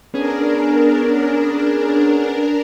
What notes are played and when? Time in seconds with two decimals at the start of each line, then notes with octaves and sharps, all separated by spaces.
0.14 B3 C#4 D4 G#4 A#4